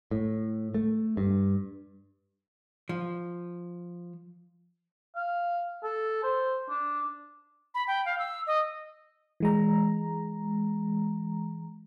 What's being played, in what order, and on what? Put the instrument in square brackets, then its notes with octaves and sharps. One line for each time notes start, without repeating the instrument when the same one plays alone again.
[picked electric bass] A2
A3
G2
[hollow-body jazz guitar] F3
[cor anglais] F5
A4
C5
D4
[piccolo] B5
G5
F5
E6
D#5
[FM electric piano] E3 G#3 A#5